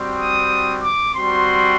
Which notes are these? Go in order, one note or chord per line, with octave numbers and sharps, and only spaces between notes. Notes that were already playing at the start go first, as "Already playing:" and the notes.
Already playing: G3 C4 F#4
D#6
D6
G3 C4 F#4 C6